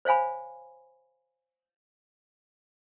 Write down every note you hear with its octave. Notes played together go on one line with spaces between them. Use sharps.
C5 C#5 F5 G#5 B5